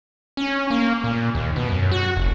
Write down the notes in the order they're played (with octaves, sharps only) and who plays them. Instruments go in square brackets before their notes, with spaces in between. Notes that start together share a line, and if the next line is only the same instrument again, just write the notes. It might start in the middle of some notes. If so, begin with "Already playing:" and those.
[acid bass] C#4
A#3
A#2
D#2
B2
F#2
F#4
F1